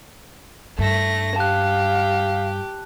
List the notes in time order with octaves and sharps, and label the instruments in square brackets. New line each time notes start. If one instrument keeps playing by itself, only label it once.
[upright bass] G2 [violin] A3 A#6
[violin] G4 [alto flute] F5 [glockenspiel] A5 F#6